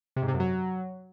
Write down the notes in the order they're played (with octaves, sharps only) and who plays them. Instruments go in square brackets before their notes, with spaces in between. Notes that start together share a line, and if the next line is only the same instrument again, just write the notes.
[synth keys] C3
G#2
C3
F#2
F#3